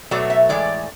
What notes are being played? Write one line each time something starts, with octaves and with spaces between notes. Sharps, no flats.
B2 F#3 A3 D5
E5
A2 E3 G#3 D5